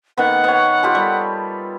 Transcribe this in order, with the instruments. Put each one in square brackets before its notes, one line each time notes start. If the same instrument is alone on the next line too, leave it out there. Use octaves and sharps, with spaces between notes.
[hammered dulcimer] D#3 A#3 B3 [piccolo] F#5
[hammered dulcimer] B3 C#5
F4 G4 A4
G3